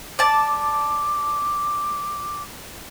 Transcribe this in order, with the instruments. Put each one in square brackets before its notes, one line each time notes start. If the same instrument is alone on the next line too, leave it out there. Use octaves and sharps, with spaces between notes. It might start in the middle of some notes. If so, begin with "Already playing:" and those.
[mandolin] D5 A5 [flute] D6